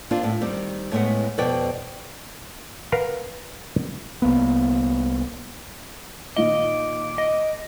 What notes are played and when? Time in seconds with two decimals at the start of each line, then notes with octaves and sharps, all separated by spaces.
0.11 A#3 C4 D4 F4
0.23 A2
0.41 D#3 G3 C4
0.92 A2 G#3 A3 B3 F#5
1.38 F2 B2 B4 D5 G5
2.92 A#4 B4 F5 F#5
4.22 C2 A#3 B3
6.37 A#2 D#3 F4 D#5 D6
7.18 D#5